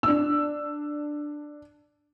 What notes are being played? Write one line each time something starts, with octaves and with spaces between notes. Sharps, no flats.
D4 E6